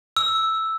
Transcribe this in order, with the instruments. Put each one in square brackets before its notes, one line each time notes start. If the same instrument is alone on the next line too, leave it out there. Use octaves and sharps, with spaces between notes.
[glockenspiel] E6